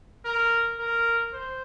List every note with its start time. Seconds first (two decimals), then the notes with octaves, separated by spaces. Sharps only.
0.25 A#4
0.79 A#4
1.33 C5